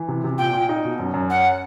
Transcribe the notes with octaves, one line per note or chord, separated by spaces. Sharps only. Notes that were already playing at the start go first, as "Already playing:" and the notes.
Already playing: E3
C3
C3
A#2 G5
A#2
D#4
B2
F#2
F#2
C#4 F#5